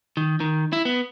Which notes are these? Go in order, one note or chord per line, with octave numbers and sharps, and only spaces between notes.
D#3
D#3
E4
B3